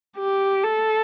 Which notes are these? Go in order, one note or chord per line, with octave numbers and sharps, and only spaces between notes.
G4
A4